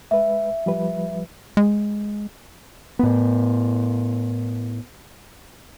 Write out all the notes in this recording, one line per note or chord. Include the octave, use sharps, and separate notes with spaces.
G#3 B4 E5
F3 G3 B4
G#3
A2 B3